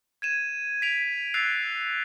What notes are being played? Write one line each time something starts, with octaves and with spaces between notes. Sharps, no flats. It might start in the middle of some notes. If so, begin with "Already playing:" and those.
G#6 D#7 E7
B6 D7 F7
E6 F#6 A6 B6 C7 F7